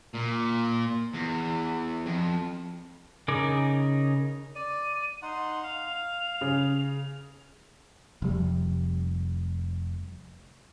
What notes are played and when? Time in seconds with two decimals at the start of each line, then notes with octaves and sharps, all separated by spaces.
0.14 A#2
1.13 E2
2.06 F2
3.28 C#3 D#4 G#4 A#4 D6
4.55 D5 D#7
5.22 D#4 F#5 C6
5.63 F5 F7
6.41 C#3
8.22 F1 G3